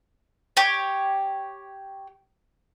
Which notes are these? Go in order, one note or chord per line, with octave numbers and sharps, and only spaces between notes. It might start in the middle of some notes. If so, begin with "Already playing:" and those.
G4 C#5